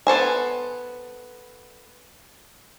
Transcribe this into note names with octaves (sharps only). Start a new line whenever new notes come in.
B3 A4 C5 G#5